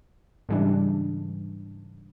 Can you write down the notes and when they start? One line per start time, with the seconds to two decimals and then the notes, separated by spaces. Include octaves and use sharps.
0.49 G#2 C#3 E3 G3 D4